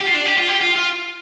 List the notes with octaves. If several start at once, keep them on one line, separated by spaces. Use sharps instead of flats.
G4
F4
D4
G4
F4
G4
F4
F4